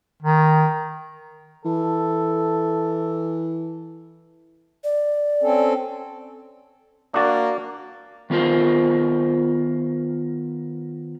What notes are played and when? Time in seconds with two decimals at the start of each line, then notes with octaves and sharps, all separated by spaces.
0.22 D#3
1.65 E3 A4
4.84 D5
5.42 C4 C#4 A4
7.14 A#3 D4 F#4 D5
8.30 D#3 B3 F4 A#4 C5